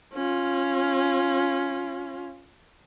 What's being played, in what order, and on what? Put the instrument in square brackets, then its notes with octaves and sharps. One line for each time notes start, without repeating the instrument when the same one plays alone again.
[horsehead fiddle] C#4 F4